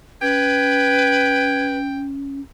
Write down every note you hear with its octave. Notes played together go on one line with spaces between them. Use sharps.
C#4 B4 G5 G#6